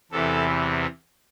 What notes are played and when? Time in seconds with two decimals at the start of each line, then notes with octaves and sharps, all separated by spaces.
0.11 E2 C3 E3 A4